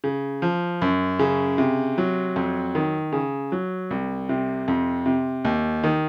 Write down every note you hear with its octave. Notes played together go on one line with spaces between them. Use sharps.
C#3
F3
F#2
C#3
C3
F#3
F2
D#3
C#3
F#3
C2
C3
F2
C3
D#2
D#3